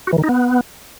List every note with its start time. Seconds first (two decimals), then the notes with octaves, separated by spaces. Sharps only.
0.07 F#4
0.13 E3
0.18 D#3
0.24 D#4
0.29 B3